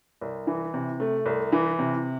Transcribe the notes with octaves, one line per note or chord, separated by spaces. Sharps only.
C2
E3
C3
A3
C2
E3
C3